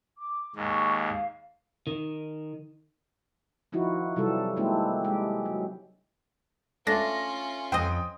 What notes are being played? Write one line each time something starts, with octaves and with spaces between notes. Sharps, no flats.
D6
D#2 G#2 C6 C#6
F5
D#3
D#3 F3 D#4 E4 F#4
C3 E3 F#3 G3 A4
D#3 G#3 A#3 C4 D4 E4
G#3 G4
F#3
A3 C#4 D4 F4 A#6
F2 C5 D#5 G5 D#6